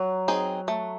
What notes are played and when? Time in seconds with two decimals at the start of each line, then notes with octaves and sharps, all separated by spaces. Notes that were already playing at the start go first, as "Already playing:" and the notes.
Already playing: F#3
0.28 C4 D#4 G#4
0.68 A3